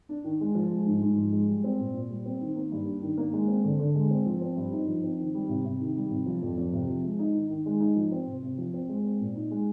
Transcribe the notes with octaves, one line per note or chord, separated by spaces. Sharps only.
D4
D#3
G#3
F3
G#3
G#2
G#2
F3
G#3
G3
C4
A#2
A#2
G3
C4
D#3
A#3
G2
D4
D#3
A#3
G#3
C4
D3
D3
G#3
C4
F3
C4
G2
D#4
F3
C4
D#3
G3
C3
C3
D#3
G3
C3
F3
F2
F2
C3
F3
G#3
D#4
D#3
D#3
G#3
D#4
F3
C4
C3
C3
F3
C4
G#3
C4
A#2
D#4
G#3